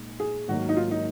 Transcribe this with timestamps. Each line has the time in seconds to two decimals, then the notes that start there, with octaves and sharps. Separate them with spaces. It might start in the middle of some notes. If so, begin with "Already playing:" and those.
Already playing: A#2 G#3 D#4
0.20 G#4
0.48 G#2 D#3 F#3 A#3 F#4
0.69 D#4
0.77 F4
0.91 D#4